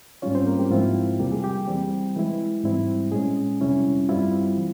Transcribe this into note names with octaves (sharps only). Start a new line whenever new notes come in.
G#2 G3 C#4 F4 C#5
C4 C5
A#3 A#4
G4
G#2 F3 C4 E4 F4
E2 C3 G3 A#3 G4
G#4
G4
E3 G3 C4
E3 G#3 E4
G#2 G3 C4 E4
A#2 G#3 C#4 G#4
F2 C3 G3 C#4 E4
G2 G3 C4 E4 F4
E3